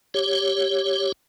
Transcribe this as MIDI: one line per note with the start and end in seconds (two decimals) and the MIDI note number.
0.14 1.12 67
0.14 1.12 73